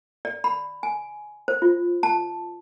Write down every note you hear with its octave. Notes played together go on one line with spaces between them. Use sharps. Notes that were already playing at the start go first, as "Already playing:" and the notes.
D5
B5
G#5
C5
F4
A5